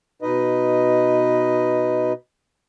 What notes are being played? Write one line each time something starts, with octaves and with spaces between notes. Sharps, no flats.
B2 D#4 B4 D#5